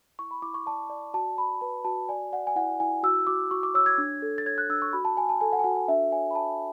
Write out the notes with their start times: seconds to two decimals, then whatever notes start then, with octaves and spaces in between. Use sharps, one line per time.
0.19 E4 C#6
0.31 B5
0.42 E4 D6
0.54 C#6
0.66 D5 A5
0.90 D5
1.14 F#4 A5
1.37 D5 B5
1.61 B4 A5
1.85 F#4 A5
2.09 D5 G#5
2.32 D5 F#5
2.47 G#5
2.56 E4 F#5
2.80 E4 G#5
3.03 F#4 E6
3.27 F#4 D6
3.51 F#4 C#6
3.63 D6
3.74 C#5 E6
3.86 G#6
3.98 D4
4.22 A4
4.38 A6
4.46 C#5 G#6
4.58 F#6
4.69 D4 E6
4.82 C#6
4.93 F#4 B5
5.05 A5
5.17 F#4 G#5
5.29 A5
5.41 A4 G#5
5.53 F#5
5.59 G#5
5.64 F#4 F#5
5.76 G#5
5.88 D4 E5
6.12 C#5 G#5
6.31 B5
6.35 C#5 A5